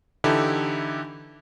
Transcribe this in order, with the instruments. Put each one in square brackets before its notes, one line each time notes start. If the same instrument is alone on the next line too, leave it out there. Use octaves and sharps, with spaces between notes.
[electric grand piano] D3 E3 D#4 E4 G4 A4